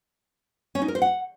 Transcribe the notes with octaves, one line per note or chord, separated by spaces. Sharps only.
C#4
D#4
A#4
C5
F#5